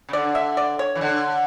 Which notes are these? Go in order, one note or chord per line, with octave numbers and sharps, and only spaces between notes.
C#3
D3 D5
E5
D5
C#5
E3
D3